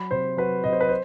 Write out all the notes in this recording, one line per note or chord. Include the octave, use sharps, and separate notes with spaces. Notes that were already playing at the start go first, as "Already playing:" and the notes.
Already playing: F#3 B5
C3 C5
F#3 B4
C3 D#5
C5
B4
C5